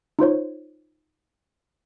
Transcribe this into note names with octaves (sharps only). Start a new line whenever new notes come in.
D#4 F4 C5 C#5